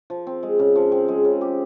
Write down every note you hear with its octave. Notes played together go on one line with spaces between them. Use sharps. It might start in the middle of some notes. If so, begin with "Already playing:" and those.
F3
C4
G#3
C#3
F3
C4
G#3
C#3
G4